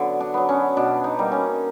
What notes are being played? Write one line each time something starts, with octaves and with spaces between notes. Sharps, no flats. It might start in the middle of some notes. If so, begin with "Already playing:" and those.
Already playing: D3 F#3 B3
D4
F#3 B3
C#4
B2 D4
D#4
G3 A#3
C#4